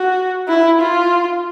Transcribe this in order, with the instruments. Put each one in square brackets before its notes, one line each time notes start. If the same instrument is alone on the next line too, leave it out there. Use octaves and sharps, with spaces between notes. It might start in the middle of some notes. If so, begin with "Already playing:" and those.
Already playing: [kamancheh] F#4
E4
F4